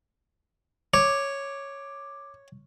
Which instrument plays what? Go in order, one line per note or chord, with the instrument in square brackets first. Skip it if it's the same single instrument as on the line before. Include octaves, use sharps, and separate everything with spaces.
[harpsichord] C#5 [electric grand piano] D6